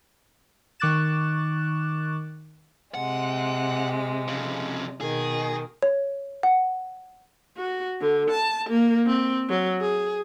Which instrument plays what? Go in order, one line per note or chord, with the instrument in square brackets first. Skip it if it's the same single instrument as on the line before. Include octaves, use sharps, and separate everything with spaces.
[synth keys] D#3 C#6 D6 F#6 A6 E7
[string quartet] C3 G#3 [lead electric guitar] F#5
[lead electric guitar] F2 C#3
[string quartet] B2 D#3 [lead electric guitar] G#4
[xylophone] C#5
F#5
[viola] F#4
D3
A5
A#3
C4
F#3
G#4